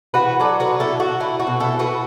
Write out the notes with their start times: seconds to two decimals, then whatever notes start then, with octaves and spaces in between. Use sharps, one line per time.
0.14 E3 F#4 B4
0.40 F#3 A4 D5
0.60 F#4 B4
0.67 D3
0.80 E4 A4
0.93 D3
1.00 F#4
1.20 A3 E4
1.40 F#4
1.47 B2
1.60 E4 A4
1.73 B2
1.79 F#4 B4